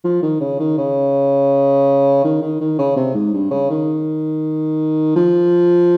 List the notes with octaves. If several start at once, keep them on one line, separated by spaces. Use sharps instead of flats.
F3
D#3
C#3
D#3
C#3
D#3
D#3
D#3
C#3
C3
G#2
G2
C#3
D#3
F3